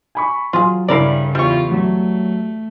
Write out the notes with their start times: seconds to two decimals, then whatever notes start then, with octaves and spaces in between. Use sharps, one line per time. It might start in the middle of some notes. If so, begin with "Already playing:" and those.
0.15 G#5 B5 C#6
0.53 F#3 F4 G#4
0.88 G2 C#3 C#4 E4 A#4 D5 C7
1.35 E2 G3 F4 C#6
1.71 F#3 A3